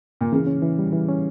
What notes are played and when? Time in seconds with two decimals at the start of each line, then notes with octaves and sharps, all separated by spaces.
0.21 A#2
0.32 C#3 E3
0.47 C#4
0.62 E3
0.79 G3
0.93 E3
1.09 C#4